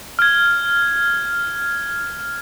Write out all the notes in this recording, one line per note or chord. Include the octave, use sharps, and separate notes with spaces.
F6 G#6